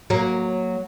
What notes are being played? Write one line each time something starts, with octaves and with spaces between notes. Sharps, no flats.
F#3 A#3